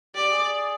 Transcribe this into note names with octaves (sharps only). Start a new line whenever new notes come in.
G4 D5
G#4